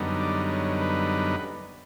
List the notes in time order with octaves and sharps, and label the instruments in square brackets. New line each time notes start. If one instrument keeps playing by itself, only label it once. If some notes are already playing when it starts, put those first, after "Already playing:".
Already playing: [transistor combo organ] F#2 D3 G3 B3 D#4
D5
C#5
B4